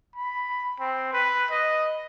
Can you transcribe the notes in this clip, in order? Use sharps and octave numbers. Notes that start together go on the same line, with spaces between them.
B5
C4
B4
D#5